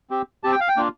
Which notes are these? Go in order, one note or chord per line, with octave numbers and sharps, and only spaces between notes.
C4 G4
C4 G4 A5
G5
F5
G5
A#3 D4 F4